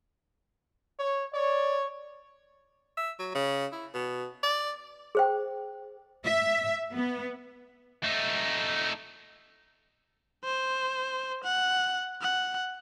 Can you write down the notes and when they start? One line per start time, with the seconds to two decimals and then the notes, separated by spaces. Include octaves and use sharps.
0.99 C#5
1.34 C#5 D5
2.98 E5
3.20 F#3
3.35 C#3
3.72 E4
3.94 B2
4.43 D5
5.15 G#4 C5 G5
6.24 E5
6.93 B3
8.03 A3 D#4
10.44 C5
11.44 F#5
12.21 F#5